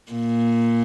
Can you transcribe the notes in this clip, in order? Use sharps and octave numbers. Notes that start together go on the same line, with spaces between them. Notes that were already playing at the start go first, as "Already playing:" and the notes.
A#2